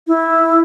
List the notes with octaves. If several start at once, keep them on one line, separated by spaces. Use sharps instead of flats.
E4